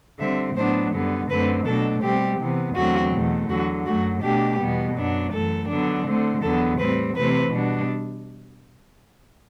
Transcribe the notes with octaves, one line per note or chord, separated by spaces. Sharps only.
D3 G3 C4 E5
A2 F#3 B3 D4 C5
F#2 D3 G3 B3
F#2 D3 A3 C4 B4
B2 F#3 A3 D4 A4
B2 G3 C4 G4
C3 E3 B3
E2 D3 F#3 A3 C4 F#4
E2 B2 A3
E2 D3 F#3 F#4
F#2 F#3 A3 F#4
B2 A3 D4 G4
E2 B2 G3 B3
F#2 F#3 B3 D4
F#2 E3 A3 A4
D3 F#3 B3 D4
D3 A3 C4
E2 D3 F#3 B3 A4
A2 G3 C4 B4
C3 E3 A3 C4 B4
B2 G3 D4